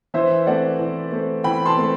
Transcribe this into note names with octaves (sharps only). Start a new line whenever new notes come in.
E3 C5 E5
A3 C4 D5 F#5
E3
A3 C4
E3 G5 B5
A5 C6
A3 C4